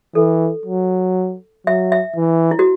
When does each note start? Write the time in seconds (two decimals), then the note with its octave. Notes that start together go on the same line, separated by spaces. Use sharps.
0.15 E3 A4
0.66 F#3
1.67 F#3 E5
1.92 E5
2.16 E3
2.51 E4
2.59 F#4